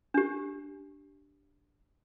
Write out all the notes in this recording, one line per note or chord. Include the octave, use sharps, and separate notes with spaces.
D4 G4